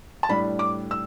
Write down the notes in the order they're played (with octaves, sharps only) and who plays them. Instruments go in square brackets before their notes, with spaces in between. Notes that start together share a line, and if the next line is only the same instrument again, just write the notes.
[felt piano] A5
A2 G3 D4 B5
D6
E6